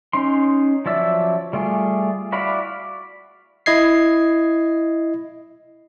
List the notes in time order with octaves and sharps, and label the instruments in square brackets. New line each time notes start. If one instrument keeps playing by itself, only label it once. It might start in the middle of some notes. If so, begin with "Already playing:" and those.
[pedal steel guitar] C#4 D#4 C6
F3 F#3 D5 E5 E6
G3 A3 F4 G#4
E4 F#4 D5 F5 B5
[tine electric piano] E4 D#5 G#6 C7